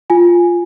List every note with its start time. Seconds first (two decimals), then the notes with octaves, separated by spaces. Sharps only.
0.10 F4 G#5